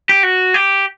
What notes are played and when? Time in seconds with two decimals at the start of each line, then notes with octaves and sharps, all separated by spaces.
0.09 G4
0.23 F#4
0.54 G4